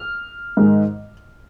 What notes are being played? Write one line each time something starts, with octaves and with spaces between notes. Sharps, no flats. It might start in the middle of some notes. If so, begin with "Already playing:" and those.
Already playing: F6
G#2 D#3 G#3